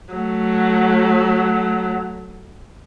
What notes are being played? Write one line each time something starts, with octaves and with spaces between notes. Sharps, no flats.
F#3 A3